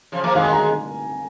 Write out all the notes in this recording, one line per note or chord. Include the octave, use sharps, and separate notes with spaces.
C#3 F3
F3 A#3
D#3 G#3 F5
G#5
A#5